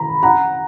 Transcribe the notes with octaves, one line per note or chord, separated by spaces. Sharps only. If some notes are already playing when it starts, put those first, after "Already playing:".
Already playing: A#5 B5
F#5 A#5